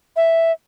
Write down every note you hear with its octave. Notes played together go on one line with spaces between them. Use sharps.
E5